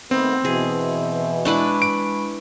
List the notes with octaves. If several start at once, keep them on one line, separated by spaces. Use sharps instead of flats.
D#3 A3 B3 C4
B2 E3 G#4
G#3 D4 E4 B4 B5 C#6
D7